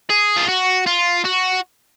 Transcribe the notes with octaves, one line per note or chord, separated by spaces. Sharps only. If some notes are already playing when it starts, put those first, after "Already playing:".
G#4
F4
F#4
F4
F#4